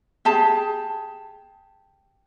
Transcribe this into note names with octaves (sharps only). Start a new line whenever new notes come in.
G4 G#4 A5